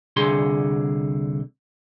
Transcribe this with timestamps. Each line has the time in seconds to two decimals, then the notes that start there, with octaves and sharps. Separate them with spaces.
0.16 C2 D3 G#4 C6